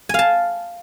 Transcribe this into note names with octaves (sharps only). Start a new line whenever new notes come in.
F5 G#5 A5